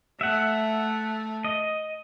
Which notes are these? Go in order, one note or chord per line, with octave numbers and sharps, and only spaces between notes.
A3 E5 F#5
D#5